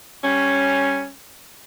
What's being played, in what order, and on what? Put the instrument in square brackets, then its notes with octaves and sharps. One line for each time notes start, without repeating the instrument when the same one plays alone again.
[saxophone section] G3 C#4